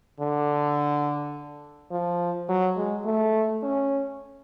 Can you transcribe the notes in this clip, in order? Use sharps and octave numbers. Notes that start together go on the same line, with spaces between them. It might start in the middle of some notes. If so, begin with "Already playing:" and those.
D3
F3
F#3
G#3
A3
C#4